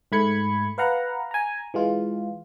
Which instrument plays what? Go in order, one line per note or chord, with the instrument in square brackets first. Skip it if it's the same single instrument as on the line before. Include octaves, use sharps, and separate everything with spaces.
[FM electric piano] G#2 A3 B5 G#6 C#7
B4 F5 F#5 A#5
G#5 A#5
E3 G#3 F4